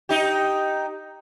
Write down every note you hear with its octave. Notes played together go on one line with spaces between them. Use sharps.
D#4 G4